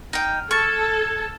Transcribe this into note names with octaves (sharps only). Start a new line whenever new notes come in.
D#4 G5 F6
A4 C#6 F6 G#6 A6